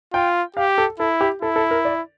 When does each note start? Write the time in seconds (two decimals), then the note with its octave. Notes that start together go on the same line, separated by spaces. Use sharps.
0.13 F4 G5
0.56 G4 F5
0.78 A4
0.99 E4 A4
1.21 G4
1.42 E4 A4
1.56 A4
1.71 A#4
1.85 D5